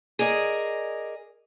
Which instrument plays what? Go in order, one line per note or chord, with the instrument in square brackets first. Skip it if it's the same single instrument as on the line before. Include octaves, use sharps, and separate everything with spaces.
[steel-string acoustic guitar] G#4 A#4 D5 D#5